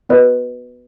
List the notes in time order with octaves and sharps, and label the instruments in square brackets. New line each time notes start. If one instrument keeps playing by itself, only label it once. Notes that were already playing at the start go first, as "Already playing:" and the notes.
[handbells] B3 F#4 B4 D#5